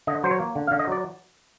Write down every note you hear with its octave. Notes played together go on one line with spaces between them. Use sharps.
D3 D#5
F#3 C5
C#5
A#3
D3
F5
D3
D#5
F#3 D5